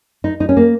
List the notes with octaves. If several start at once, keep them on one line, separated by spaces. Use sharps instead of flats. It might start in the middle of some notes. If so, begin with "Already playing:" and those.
D#4
D#4
C#4
A#3